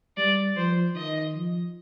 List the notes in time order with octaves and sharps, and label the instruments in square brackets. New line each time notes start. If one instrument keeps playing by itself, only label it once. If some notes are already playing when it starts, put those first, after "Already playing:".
[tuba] G3 [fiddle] D5
[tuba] F3 [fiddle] C5
[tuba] D#3 [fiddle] D#5
[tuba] F3